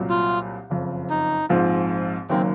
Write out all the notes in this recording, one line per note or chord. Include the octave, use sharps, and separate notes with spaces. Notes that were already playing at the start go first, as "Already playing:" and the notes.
Already playing: C2 A#2 F#3
F4
F#1 F2 C#3
D#4
A#1 G#2 F3 C4 F4
F#1 F#2 D#3 F#3 A#3 C4